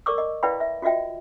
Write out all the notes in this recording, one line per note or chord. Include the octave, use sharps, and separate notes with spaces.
A#4 D5 C#6 D6 E6
D#5
E4 B4 D5 F5 G5 B5
E5
F4 F#4 D#5 E5 G5